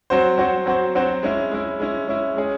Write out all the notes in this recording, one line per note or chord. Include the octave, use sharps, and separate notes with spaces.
F#3 C4 F#4 C5
F#3 C4 F#4 C5
F#3 C4 F#4 C5
F#3 C4 F#4 C5
G#3 C#4 E4
G#3 C#4 E4
G#3 C#4 E4
G#3 C#4 E4
G#3 C#4 G#4